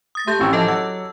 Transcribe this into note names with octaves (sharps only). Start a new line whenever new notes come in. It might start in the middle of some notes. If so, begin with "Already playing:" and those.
D#6 A6 A#6
A3 G4 G6 A6
A1 C4 C#6 E6
F3 A4 D#5 A5
F#3 F#5 E6